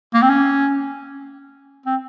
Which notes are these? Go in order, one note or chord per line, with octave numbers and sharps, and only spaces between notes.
A#3
C4
C#4
C4